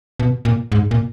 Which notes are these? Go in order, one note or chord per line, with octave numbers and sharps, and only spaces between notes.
B2
A#2
G#2
A#2